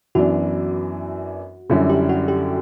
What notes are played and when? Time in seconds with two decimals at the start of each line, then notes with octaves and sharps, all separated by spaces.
0.15 F#2 E3 B3 D4 F#4
1.70 F#2 D3 G3 C#4 E4
1.90 G4
2.09 F#4
2.28 G4